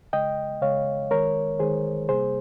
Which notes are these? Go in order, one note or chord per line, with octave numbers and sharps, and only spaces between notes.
C#3 G#3 D#5 G5
C#3 G#3 C#5 F5
D#3 G#3 A#4 C#5
D#3 G#3 G#4 C5
C3 G3 A#3 G#4 C5